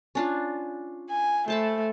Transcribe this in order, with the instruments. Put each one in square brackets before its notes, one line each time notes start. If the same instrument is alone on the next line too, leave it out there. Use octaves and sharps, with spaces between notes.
[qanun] C#4 D4 F4
[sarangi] G#5
[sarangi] A3 [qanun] C5 A5 B5